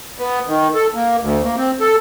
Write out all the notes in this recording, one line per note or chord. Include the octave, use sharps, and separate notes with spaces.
B3
D#3
A4
A#3
D2
A#3
C4
A4